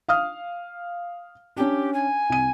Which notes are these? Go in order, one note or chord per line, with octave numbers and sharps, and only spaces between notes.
F5 D#6 F6
C#4 D4 G4
G#5
C2 D#7